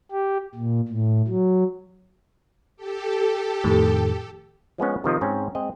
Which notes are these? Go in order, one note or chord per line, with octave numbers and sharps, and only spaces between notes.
G4
A#2
A2
F#3
G4 A4
F2 A2 D#3
F3 G#3 B3 C#4
C3 D#3 F3 D#5
G#2 C4 C#4
G#3 C4 D#5